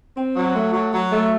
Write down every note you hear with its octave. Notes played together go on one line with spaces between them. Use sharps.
C4
F#3
A3
F#3
F#3
A3